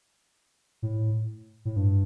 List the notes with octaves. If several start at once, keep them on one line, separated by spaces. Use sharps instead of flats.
A2
A2
G2